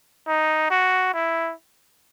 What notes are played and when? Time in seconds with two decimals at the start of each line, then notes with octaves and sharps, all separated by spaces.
0.27 D#4
0.70 F#4
1.14 E4